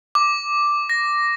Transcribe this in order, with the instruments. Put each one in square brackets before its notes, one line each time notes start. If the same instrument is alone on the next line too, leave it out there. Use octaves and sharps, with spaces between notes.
[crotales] D6
A#6